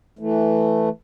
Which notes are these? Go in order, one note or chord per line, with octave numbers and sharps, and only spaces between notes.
E3 A3